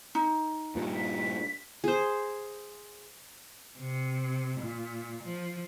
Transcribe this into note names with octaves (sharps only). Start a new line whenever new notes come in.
D#4
G2 A#2
B6
G#4 C5
C3
A#2
F3